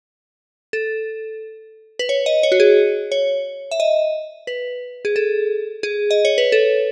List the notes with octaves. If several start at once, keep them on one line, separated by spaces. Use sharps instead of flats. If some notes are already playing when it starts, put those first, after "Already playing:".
A4
B4
C#5
D#5
C#5
F#4
G#4
C#5
E5
D#5
B4
G#4
A4
G#4
D#5
C#5
B4
A4